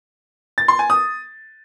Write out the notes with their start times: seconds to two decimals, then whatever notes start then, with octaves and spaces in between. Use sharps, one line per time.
0.58 A6
0.68 C6
0.79 G#5
0.90 D#6